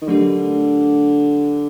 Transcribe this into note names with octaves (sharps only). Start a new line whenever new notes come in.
D#3
D3 F#3 A3 D4 G4 A#4